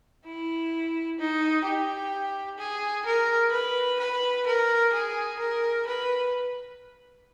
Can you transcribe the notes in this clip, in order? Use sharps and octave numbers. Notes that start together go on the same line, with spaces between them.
E4
D#4
G4
G#4
A#4
B4
B4
A#4
G#4
A#4
B4